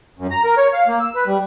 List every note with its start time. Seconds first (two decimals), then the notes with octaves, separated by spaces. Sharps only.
0.19 F#2
0.31 A#5
0.44 A#4
0.57 C#5
0.73 F5
0.88 A#3
1.00 E6
1.15 B4
1.27 G3